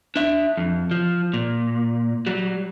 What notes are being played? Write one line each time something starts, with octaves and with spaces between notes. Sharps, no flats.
D4 E5
F2
F3
A#2
F#3 G3